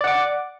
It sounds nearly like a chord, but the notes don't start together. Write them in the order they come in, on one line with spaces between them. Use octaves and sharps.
D5 F#5 D6